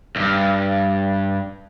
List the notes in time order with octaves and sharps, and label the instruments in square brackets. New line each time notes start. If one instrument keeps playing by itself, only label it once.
[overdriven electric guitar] D2 G2